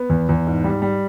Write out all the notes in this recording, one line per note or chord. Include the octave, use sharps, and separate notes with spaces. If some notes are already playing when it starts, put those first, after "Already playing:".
Already playing: B3
E2
E2
G#2
G3
G3